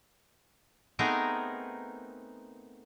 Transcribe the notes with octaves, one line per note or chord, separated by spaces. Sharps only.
A3 B3 C4 D#4 G#4 A#4